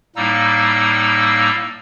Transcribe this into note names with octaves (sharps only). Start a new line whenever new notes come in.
A2 G3 A#3 D#4 E6